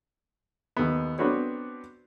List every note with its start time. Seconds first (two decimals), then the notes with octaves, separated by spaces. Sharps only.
0.77 D#2 B3
1.19 B3 C4 D4 F#4 B4 C#5